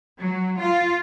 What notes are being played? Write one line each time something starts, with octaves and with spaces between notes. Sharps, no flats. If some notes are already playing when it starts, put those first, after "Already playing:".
F#3
F4